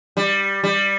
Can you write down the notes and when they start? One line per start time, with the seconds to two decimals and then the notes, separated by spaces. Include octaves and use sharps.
0.17 G3
0.63 G3